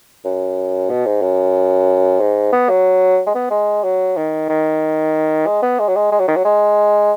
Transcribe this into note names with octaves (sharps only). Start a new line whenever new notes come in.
F#2
B2
G#2
F#2
G#2
B3
F#3
G#3
B3
G#3
F#3
D#3
D#3
G#3
B3
G#3
F#3
G#3
G#3
F#3
D#3
F#3
G#3